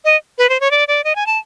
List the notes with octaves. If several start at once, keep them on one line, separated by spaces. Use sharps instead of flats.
D#5
B4
C5
C#5
D5
D5
D#5
G#5
A5